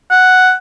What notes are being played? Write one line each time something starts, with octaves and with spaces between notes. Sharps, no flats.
F#5